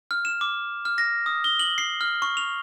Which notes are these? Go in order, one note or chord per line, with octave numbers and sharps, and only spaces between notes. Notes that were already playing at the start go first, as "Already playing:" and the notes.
F6
E7
D6
F6
A#6
D#6
G7
F#7
C7
F6
C#6
F7